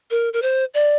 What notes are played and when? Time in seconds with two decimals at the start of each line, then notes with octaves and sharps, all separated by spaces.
0.11 A#4
0.33 A#4
0.42 C5
0.74 D5